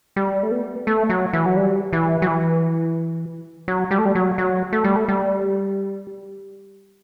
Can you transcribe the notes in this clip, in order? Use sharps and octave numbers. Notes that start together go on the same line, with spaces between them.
G3
A3
B3
A3
F#3
E3
F#3
G3
E3
F#3
E3
F#3
G3
A3
G3
F#3
F#3
A3
G3
A3
G3